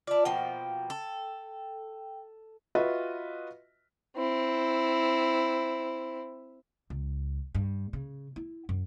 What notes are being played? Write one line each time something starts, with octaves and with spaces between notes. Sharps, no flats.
E4 F4 D5 A5
B2 F3 A#3 G5
A4
F4 F#4 B4 D#5 E5
C4 E4
C#2
G2
C#3
E4
F#2